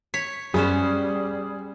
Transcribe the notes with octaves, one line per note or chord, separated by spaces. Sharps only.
C#5 B6
F#2 G3 B3 C#4 G#4 C5